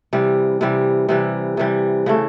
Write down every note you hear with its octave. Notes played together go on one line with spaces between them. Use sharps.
C3 E3 G3
C3 E3 G3
C3 E3 G3
C3 E3 G3
C#3 E3 A3